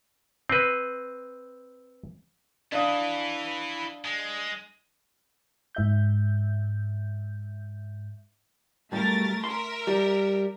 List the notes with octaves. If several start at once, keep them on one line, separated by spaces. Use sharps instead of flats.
C4 B4
D4 E4 B4 F5 D#6
G#3
G#2 E5 G6
B1 G3 A3 A#4 A6
A#4 E5 C6
G3